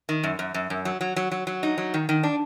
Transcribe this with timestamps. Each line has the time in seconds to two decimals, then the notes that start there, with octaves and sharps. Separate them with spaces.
0.09 D#3
0.23 F#2
0.39 F#2
0.54 F#2
0.70 F#2
0.85 F#3
1.01 F#3
1.16 F#3
1.32 F#3
1.47 F#3
1.63 D#4
1.78 F#3
1.94 D#3
2.09 D#3
2.23 D4